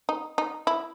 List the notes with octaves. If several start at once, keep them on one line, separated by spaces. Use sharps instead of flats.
D#4
D#4
E4